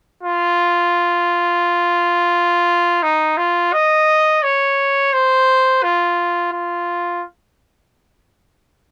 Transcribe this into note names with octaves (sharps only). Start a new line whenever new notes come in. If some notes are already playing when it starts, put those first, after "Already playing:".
F4
D#4
F4
D#5
C#5
C5
F4
F4